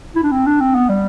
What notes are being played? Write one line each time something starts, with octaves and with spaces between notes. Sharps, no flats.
E4
D4
C4
D4
C4
B3
G3